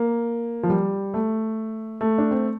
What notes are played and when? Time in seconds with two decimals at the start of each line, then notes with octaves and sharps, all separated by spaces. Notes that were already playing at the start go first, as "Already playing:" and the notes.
Already playing: A#3
0.63 F3
0.70 G3
1.14 A3
2.01 A3
2.18 D4
2.31 C4